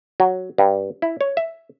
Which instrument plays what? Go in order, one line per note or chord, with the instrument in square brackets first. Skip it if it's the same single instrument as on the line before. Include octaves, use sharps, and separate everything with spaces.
[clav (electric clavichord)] F#3
G2
E4
C#5
E5